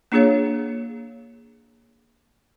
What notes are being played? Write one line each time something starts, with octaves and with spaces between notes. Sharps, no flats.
A#3 D4 F4 G#4 C#5 F5